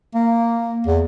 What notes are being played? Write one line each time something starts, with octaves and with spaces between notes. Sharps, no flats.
A#3
E2